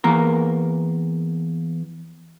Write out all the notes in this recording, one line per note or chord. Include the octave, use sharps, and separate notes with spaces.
E2 A#3 A#4